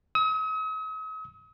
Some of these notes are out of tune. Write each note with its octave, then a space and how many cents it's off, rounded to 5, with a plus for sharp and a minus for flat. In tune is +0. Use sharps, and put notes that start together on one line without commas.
D#6 +45